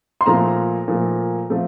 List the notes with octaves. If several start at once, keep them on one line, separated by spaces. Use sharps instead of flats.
C6
A#2 F3 A3 A#5
A#2 F3 A3
F3 A3